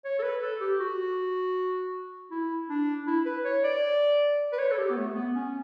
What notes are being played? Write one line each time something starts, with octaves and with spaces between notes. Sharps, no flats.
C#5
A4
B4
A4
G4
F#4
E4
D4
E4
B4
C#5
D5
B4
C#5
A4
G4
B3
A3
B3
C#4